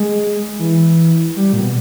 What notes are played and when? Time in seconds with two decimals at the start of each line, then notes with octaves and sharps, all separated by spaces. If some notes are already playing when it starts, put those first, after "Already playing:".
Already playing: G#3
0.59 E3
1.36 G3
1.53 A#2
1.60 B2